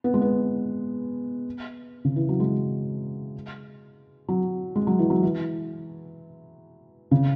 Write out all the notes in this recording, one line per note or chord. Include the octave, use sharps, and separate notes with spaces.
B3
G#3
B3
C#3
E3
F#3
G#3
F#3
G#3
F#3
E3
F#3
E3
C#3